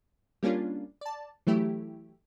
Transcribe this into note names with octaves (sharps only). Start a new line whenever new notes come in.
G3 A#3 C#4 D4 F4
D5 A5
E3 F#3 A3 E4 G4